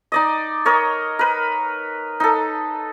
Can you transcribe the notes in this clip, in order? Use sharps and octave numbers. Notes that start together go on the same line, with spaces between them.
D#4 D5 D#5
A#4 C#5 D#5
A#4 B4
D#4 A4